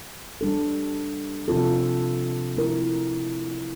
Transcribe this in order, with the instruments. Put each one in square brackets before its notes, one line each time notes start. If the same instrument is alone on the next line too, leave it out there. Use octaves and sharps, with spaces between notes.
[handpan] G3 D4 A4
C3 F3 C4 F4 A4
F3 A3 E4 A#4